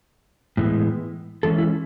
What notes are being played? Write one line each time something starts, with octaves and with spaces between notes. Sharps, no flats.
A2 E3 G#3 B3
E3 G#3 C#4 A4
E4